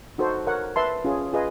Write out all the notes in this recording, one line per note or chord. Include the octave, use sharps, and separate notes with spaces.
D#4 F#4 A4 C5
A#4 C#5 F#5
B4 E5 A5 C6
C#4 F4 G#4
F4 G#4 B4 D#5